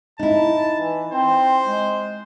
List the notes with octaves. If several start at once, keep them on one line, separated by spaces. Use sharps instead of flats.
D#4 E4 A5
E3
C4 C5
G#3